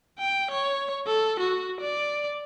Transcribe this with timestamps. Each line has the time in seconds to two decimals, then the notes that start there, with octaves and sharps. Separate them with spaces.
0.19 G5
0.51 C#5
1.07 A4
1.40 F#4
1.81 D5